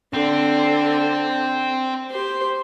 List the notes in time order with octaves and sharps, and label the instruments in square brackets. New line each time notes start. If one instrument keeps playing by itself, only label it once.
[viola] D3 [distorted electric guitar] C4
[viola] G4 C5